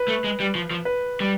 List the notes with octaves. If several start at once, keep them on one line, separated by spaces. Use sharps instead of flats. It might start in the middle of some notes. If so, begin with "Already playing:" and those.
Already playing: B4
A3
G#3
G3
F3
F3
B4
G3